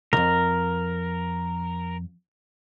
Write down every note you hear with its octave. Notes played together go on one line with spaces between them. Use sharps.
C2 F2 A#4